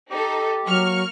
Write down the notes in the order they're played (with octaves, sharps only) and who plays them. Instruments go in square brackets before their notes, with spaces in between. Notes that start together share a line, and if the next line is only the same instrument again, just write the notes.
[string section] D#4 A4 [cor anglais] G4
[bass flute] F#3 [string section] A#3 C#6 F6